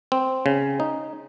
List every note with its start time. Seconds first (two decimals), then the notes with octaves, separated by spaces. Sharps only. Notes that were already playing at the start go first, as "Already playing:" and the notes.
0.12 C4
0.46 C#3
0.80 D#4